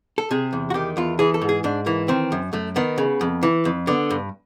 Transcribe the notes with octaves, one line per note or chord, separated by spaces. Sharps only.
A4
C3 G#4
E2
F#4
D#3 G4
E2 F4
E3 G#4
A4
G#2
G#4
G#2 D4
E3 A#3
D#3 C4
F#2
F#2 A3
D#3 B3
C#3
F2
E3
F2
D3 B3
G2